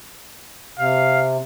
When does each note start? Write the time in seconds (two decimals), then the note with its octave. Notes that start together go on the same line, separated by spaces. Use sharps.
0.79 C3 F5